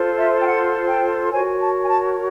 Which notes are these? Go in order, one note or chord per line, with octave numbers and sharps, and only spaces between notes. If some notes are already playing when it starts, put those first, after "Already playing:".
Already playing: F4 A4 C5
E5
G5
F#5
G5
F#4 A#4 C#5 G#5
A5
G#5
A5